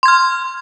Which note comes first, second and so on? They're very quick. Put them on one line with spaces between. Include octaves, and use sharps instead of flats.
C6 G#6 F6